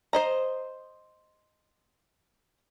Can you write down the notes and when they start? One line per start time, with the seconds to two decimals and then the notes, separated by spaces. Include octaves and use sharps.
0.13 C5 D#5 A#5